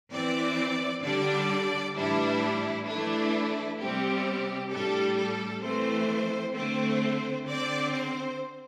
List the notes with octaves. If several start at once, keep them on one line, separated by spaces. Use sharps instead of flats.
E3 C4 D5
D3 G3 D4 D5
A2 E3 G3 D4 E4
E3 A3 D4 E4
C3 G3 C4 G4
A2 G3 D4 A4
A4
E3 A3 C4 C5
D3 A3 C4 C5
D3 C4 D5
C5